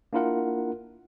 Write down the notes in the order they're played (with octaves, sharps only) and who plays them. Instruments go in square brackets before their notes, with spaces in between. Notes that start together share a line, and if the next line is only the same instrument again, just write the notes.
[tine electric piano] A#3 D4 E4 F4 A#4 F#5